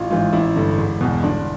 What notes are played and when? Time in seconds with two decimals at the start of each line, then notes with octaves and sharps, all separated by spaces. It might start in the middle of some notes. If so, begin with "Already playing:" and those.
Already playing: A1 F4
0.10 G#2 E3 F4
0.33 A1 E4
0.56 G2 D3
0.78 E1
1.01 E2 B2
1.23 G1 D4